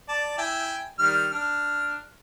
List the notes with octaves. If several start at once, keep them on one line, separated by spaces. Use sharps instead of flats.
D5 A5
E4 G5 G#5
D#3 G3 F6
D4 F6